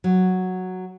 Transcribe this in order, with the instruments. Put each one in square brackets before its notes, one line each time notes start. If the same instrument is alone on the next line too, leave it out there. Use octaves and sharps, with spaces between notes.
[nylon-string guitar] F#3